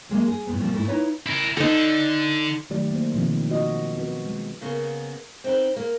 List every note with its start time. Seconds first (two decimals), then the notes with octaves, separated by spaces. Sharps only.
0.09 F#3 G#3 A#3
0.28 G#4
0.47 A2 C3 B3
0.60 B2 F3 G3 A3 A#3 C4
0.73 G#2 A3 E4
0.88 D#4 E4 B4 C#5 E5
1.26 E4 A#4
1.57 D3 D#4 A4
2.70 D#3 F#3 A3 G4 D5
2.91 A#3 C5
3.14 B2 D#3 F3 C4
3.49 F4 F#4 D#5
3.95 B3 C4 F#4 B4
4.26 G#3
4.61 C#3 A#3 B3
5.44 C4 D#4 B4
5.76 A#3